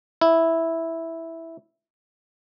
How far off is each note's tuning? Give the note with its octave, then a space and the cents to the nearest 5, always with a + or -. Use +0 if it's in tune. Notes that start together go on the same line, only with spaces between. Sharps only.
E4 -5